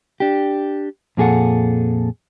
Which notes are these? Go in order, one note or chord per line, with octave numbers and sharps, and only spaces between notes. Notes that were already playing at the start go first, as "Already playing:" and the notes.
D4 G4
F2 A#2 G#4 A4 F#5